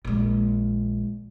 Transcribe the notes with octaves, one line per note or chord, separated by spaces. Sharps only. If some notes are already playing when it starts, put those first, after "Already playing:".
A#1 G#3